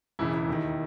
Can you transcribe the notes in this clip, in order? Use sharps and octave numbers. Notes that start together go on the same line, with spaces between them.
E1 E2 C#3 E3 E4
E4
D#2 D#3